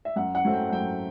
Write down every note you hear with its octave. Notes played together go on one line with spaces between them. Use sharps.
E5
F#2 F#5
F#5
F#3 A3 C4
G5
F#5
F#2 G5